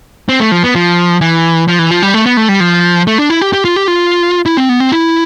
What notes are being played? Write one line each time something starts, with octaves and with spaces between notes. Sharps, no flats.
C4
A3
F3
B3
F3
E3
F3
E3
F3
G3
A3
B3
A3
G3
F3
A3
D4
E4
G4
G4
F4
G4
F4
E4
C4
B3
C4
E4